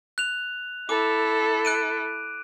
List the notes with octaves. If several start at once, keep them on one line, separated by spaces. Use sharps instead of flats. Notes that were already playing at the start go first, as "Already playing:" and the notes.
F#6 F7
E4 A4 D6
F#6 D7 D#7